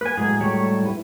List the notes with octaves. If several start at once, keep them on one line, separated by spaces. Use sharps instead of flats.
A#3 B4 G#5
A2 F#3 G#3 G#4
G3 A3 C#5
E4 B4